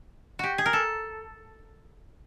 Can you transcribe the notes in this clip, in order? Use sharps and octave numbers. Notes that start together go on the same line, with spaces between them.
F#4 G4
G#4
A#4
A4